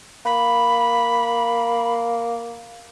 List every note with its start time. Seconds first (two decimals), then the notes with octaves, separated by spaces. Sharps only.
0.25 A#3 B5